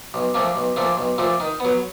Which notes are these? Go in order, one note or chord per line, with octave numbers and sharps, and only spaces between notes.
B1
A#2 F3 A3 D4
B1
A#2 F3 A3 D4
B1
A#2 F3 A3 D4
D#3
F#3 B3